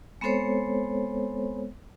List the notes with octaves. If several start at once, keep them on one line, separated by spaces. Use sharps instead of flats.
G#3 B3 C4 A4 C5 C#5